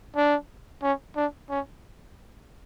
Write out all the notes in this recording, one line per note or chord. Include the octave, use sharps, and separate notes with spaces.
D4
C#4
D4
C#4